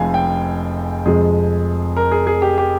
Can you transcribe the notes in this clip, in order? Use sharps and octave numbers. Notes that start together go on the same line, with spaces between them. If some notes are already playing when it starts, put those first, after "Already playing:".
Already playing: F1 F2 F3 G#3 F5 G#5
G5
F2 C3 F3 G#3 G#4
A#4
G#4
G#4
G4
G4